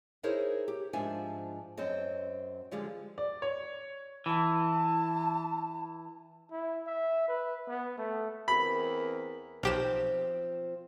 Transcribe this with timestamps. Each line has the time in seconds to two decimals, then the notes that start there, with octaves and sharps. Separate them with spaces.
0.23 D#4 E4 G#4 A#4 C5 C#5
0.68 G4
0.93 G#2 F3 D4 E5 G#5
1.77 F#2 C4 C5 D#5
2.71 D3 F3 G3 G#3
3.18 D5
3.42 C#5
4.26 E3 A5
6.51 E4
6.87 E5
7.28 B4
7.69 B3
7.98 A3
8.48 E2 C4 A#4 B5
9.63 B1 F3 C4 G4 E7